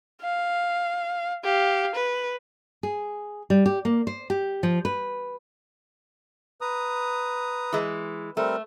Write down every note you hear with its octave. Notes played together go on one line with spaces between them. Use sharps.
F5
G4 F5
B4
G#4
G3
G4
A#3
C5
G4
F3
B4
B4 A#5 D#6
E3 G#3
G3 A3 C4 A#4